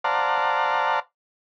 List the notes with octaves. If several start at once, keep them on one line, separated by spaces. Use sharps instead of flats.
C5 D5 F5 F#5 A5 A#5